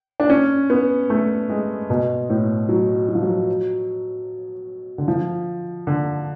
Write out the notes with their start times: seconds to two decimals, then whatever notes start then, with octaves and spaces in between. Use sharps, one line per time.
0.20 D4
0.30 C#4
0.70 B3
1.10 A3
1.50 G#3
1.90 B2
2.29 A2
2.69 F#3
3.08 F#3
3.15 F3
3.23 F#3
4.98 D3
5.08 F3
5.87 D3